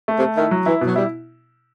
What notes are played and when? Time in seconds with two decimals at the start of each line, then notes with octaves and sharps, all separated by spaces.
0.08 A3
0.18 C3
0.22 A3
0.37 D#3 E4
0.51 F#3
0.66 E3 E4
0.81 B2
0.87 F#3
0.96 G3 E4